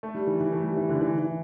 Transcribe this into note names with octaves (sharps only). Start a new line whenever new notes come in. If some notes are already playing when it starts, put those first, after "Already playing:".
A3
G3
E3
E3
A3
G3
E3
D3
E3
E3